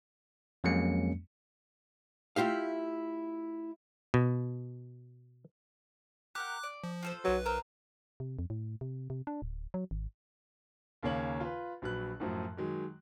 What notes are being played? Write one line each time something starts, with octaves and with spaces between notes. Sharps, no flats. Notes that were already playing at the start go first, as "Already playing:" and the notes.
F2 F#3 G#3 A#3 C#4 C#7
A3 E4 F4 G4 F5
B2
G4 A#4 F#5 D6 F#6
D5
F3
F4 A4 C5
B1 F#3 B4
A#4 C5 A#5 E6
C3
F2
A2
C3
C3
D4
D1
F#3
G#1
D#2 C#3 A#3 C#5 F#7
F4 B4
A#1 F#3 B4 F#6
F#2 A2 F3 F#3
D#3 F#3 G#3